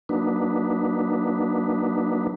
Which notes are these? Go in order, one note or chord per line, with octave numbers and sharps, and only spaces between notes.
F#3 A#3 D4 D#4 B4